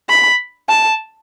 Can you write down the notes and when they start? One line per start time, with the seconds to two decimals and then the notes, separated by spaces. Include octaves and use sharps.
0.09 B5
0.69 A5